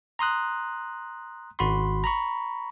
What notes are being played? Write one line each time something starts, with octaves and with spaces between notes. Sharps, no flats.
A#5 C6 D#6 F#6
G#1 F#4 B5 C6
A#5 B5 C#6